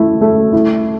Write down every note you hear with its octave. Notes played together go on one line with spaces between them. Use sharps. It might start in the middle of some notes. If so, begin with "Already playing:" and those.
Already playing: A3 E4
A3
E4